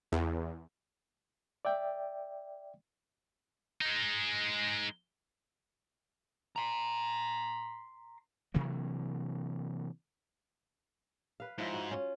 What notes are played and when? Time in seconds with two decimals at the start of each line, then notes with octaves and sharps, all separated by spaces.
0.12 E2
1.65 D5 E5 G5
3.81 G#3 D#4
6.56 A#5 C6
8.54 C3 E3 F#3 A#3
11.40 B4 F5
11.58 G#2 F3 E4
11.73 F4 F#4
11.90 C#4 F4